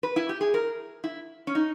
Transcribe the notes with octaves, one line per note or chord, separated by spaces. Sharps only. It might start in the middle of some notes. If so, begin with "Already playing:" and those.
B4
E4
G4
G#4
A#4
E4
C#4
D#4